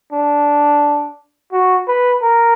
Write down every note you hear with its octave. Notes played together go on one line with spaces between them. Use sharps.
D4
F#4
B4
A#4